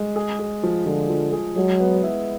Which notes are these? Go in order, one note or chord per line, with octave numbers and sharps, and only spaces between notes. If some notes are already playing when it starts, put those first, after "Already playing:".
Already playing: G#3
G#4
G#4
F3
D3 F3
F3
G#4
F#3 G#3
B3
E4